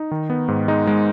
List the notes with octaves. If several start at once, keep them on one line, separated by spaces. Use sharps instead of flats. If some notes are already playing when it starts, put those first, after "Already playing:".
Already playing: D#4
D#3
B3
G#2
G#3 D#4
G#3